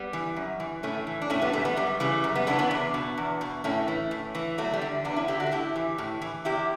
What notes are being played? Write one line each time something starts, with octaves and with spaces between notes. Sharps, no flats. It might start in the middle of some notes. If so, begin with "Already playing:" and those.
Already playing: G3 B3
E3
F#2
E3
A2 A3 C#4
E3
D4
A2 A3 C#4
G3 B3
E3 F#3 A3
G3 B3
F#2 G3
C#3 E3 G3
F#2
G3 B3
C#3 E3 B3 D4
B3 D4
E2
B2
E2
B2
A2 A3 C#4
E3
A2
E3
E2 F#3 A3
G3
D3
E2 B3 D4
C#4 E4
D3 E4 G4
D4 F#4
A4
A2 E4 G4
E3
A2
E3
E2 E4 G4